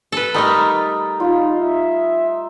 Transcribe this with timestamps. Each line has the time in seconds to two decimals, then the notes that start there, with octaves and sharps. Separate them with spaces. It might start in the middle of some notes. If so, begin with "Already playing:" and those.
0.12 A4 B4
0.34 G3 A3 D#4 A#4 B5
1.20 D#4 F4
1.60 E5